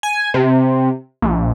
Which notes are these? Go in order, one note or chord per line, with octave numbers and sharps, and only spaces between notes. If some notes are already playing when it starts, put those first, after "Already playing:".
G#5
C3
A#1